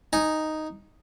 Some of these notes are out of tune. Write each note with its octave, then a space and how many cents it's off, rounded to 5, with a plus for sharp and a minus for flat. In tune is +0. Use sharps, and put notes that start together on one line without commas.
D#4 +0 G#5 +0